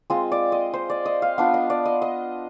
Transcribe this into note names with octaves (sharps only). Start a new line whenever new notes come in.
G#3 C4 F4 D#5
D5
D#5
C5
D5
D#5
F5
B3 D4 F4 F5
D#5
D5
D#5
D#5